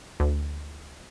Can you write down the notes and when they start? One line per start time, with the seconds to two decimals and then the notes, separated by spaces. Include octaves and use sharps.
0.20 D2